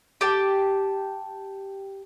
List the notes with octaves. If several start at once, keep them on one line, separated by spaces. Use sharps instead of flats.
G4 A5